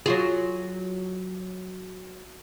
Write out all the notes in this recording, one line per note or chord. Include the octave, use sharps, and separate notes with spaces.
F#3 F4 G#4